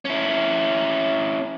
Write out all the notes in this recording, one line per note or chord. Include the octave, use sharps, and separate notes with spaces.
C#4 E4